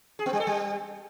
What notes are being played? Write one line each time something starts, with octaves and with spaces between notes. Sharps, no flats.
G#4
B3
G3
A4
G3